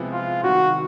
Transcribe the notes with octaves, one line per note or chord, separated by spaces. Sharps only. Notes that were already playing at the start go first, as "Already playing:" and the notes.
Already playing: C3 F3 G#3 B3 E4
F4
C3 D#3 G3 F#4